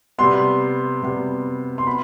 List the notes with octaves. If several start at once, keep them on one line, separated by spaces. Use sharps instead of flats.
C3 G3 B3 C6
C3 G3 B3
C6
B3 B5